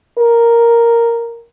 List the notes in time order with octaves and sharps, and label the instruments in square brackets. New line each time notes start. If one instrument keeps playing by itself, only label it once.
[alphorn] A#4